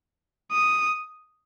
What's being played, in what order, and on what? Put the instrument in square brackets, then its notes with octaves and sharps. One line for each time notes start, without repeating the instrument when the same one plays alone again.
[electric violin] D#6